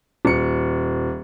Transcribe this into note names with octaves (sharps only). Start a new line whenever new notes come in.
D#1 C#7